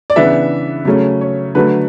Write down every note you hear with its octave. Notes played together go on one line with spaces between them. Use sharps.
D5
C#3 E3 B3 D4 E5
C#3 F#3 A3 C#4
C#5
D3 F#3 A3 B4